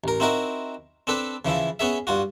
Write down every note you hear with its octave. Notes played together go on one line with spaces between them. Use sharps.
A1 A#4
C4 D#4 E4 F#4 A#4
C4 D4 A4 B4
C#3 E3 F3 E4
B3 C#4 G#4 E5
G2 F4 F#4